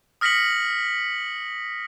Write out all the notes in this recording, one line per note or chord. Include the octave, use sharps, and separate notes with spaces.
D#6 F6 A#6 B6 C#7 F#7